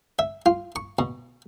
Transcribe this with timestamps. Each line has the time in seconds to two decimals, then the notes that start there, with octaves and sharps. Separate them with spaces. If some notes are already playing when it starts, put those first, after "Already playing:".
0.19 E5
0.46 F4
0.76 C#6
0.99 B2